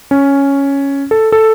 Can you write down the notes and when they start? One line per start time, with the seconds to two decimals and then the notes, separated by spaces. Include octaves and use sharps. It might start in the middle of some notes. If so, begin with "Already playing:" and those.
0.11 C#4
1.11 A4
1.32 A4